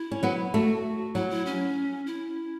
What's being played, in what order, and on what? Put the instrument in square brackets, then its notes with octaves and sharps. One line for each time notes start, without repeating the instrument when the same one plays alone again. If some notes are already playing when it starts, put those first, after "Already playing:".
Already playing: [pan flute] E4
[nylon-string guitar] C#4
F#3 B3
[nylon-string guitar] A3 [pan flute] F#4
[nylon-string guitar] F#3 [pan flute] E4
[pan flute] E4
C#4
E4